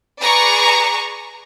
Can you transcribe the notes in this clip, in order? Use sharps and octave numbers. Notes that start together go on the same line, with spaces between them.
G#4 B4 D5 A#5 C#6